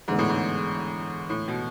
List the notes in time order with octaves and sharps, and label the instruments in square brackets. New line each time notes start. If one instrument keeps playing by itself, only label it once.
[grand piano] E2 D3 G#3 B3 [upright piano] G#2
[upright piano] A2
G#2
A2
B2